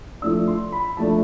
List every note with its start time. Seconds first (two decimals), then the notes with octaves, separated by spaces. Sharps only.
0.22 F3 A3 D4 E6
0.48 C6
0.72 B5
0.97 F3 A3 D4 A5